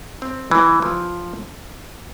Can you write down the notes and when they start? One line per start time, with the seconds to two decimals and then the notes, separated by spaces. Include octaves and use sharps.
0.22 C4
0.51 E3
0.82 F3